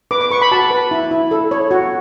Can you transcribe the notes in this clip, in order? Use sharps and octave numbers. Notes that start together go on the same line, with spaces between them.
B4 D6
D6
B4 C#6
B5
F#4 A5
B4
E4
E4
A4
C#5
F#4